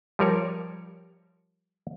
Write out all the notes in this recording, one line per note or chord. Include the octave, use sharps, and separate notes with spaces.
F3 G3 A#4 C#5